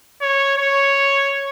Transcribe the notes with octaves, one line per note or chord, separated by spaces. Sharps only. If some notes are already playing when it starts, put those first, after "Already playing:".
C#5
C#5